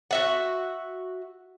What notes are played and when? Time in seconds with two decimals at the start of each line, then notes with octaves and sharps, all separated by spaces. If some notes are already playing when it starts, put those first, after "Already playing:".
0.11 F#4 E5 F#5